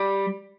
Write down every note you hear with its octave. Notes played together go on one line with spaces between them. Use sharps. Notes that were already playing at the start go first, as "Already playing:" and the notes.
Already playing: G3